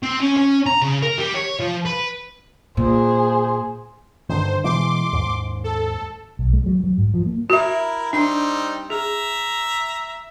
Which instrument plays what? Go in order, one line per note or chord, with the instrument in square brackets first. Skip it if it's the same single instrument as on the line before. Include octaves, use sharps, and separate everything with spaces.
[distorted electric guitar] C4
C#4
C#4
A#5
C#3
A#4
G3
C#5
F3
B4
[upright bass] A#2 [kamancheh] G#4 C5
[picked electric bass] G2 D3 D#3 [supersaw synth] C5
[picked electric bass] B2 E3 G#3 [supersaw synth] C6 D6
[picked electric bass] D#2 G#2
[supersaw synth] A4
[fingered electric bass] B1
G#3
F#3
F#3
G#2
F3
A#3
[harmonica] E4 A#4 [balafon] F#4 E5
[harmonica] G3 C4 D#4 [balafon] D4
[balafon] G#4 [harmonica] E5 A#5